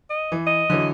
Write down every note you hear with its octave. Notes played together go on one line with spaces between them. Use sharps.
D#5
E3
D#5
D3 E3 F#3